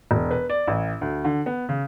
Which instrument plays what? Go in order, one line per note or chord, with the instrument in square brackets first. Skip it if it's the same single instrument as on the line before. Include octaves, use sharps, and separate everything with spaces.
[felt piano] E1
B4
D5
A1
D2
D3
B3
C#3